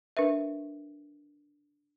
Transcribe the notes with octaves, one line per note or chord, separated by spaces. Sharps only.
D4 A#4 B4 E5